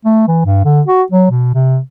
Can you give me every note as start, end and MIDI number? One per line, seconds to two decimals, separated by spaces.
0.05 0.26 57
0.28 0.41 52
0.45 0.61 43
0.65 0.82 50
0.87 1.03 66
1.12 1.28 54
1.31 1.51 47
1.55 1.79 48